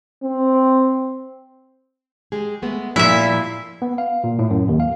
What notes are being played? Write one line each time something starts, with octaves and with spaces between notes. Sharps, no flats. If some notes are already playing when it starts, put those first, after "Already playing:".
C4
G#3 G4 G#4
G#3 A3 B3
A#2 F3 G3 E4 E5
B3
F5
A#2
A2
F#2
D#2
F5